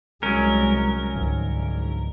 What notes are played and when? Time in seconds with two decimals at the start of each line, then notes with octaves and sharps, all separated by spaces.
0.23 C2 F#3 G#3 C#4 A#4
1.15 C#2 G#2 D3 F3